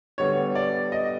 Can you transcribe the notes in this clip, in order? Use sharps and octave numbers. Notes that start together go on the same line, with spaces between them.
D3 G3 B3 C#5
D5
D#5